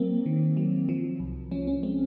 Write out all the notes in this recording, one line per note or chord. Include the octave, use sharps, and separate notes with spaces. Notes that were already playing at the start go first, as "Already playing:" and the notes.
Already playing: F#3 A#3 C4
D#3
F#3
F3
C2
F3 C#4
C#4
G#3 C4